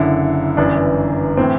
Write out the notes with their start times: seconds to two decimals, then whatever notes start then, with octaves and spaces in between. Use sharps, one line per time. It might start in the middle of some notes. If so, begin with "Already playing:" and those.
Already playing: F#1 F#2 D3 E4
0.57 G1 F#2 E3 D4
1.37 A2 E3 C4